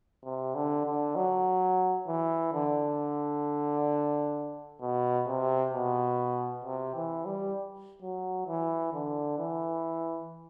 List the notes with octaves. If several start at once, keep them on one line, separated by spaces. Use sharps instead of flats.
C3
D3
D3
F#3
E3
D3
B2
C3
B2
C3
E3
G3
F#3
E3
D3
E3